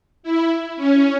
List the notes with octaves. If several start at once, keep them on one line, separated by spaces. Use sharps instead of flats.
E4
C#4